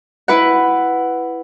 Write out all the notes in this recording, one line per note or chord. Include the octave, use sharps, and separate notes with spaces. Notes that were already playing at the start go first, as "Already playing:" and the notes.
E4 B4 F#5